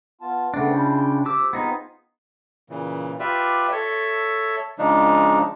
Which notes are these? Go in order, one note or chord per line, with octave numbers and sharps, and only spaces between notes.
B3 F4 A5
C#3 A3 B3 C4 D4
E4 F4 G5
F3 G4 D6 E6
B3 C4 D#4 F4 G#4
A#2 C#3 E3
F4 G4 B4 D5 E5
A4 C#5 E5
C#3 F3 G#3 D4 D#4